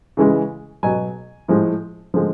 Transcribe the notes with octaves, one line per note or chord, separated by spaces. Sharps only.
C#3 E3 G#3
B2 F#3 G#5
A2 F3 G#3
D3 F3 G#3